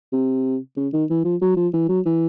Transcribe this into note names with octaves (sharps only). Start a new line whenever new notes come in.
C3
C#3
D#3
E3
F3
F#3
F3
E3
F#3
E3